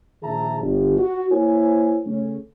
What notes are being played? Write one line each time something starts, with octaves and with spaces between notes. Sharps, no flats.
A#1 D#3 G#4 E5 A5 A#5
G1
F#4
A#3 E4 A#4 C5 C#5 G#5
C#3 A3 C#4